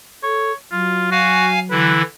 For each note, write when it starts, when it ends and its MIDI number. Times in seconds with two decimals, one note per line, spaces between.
0.23 0.52 69
0.23 0.53 73
0.72 1.93 54
0.72 1.11 65
1.11 1.47 66
1.11 1.59 77
1.11 1.59 80
1.71 2.02 50
1.71 2.02 52
1.71 2.02 64
1.71 2.00 71